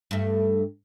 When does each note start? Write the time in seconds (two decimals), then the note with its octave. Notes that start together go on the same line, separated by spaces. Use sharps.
0.11 G2 A3